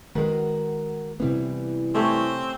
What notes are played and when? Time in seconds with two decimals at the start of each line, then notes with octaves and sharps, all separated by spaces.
0.15 D#3 G#3 F#4 A#4 B4
1.20 C3 E3 G3 B3
1.95 A3 C4 C#4 G4